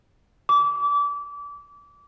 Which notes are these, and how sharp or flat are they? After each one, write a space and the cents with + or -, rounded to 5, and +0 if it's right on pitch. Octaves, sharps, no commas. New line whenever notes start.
D6 -30